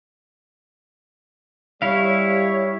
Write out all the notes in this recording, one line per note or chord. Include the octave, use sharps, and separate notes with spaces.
G3 E4 C#5 F5